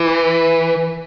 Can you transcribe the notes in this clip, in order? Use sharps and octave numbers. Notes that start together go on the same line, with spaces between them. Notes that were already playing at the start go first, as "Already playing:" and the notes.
Already playing: E3